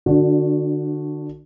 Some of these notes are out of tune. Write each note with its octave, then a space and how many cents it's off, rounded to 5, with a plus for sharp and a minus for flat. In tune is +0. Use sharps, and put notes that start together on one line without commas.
D3 +30 D4 +0 F#4 -10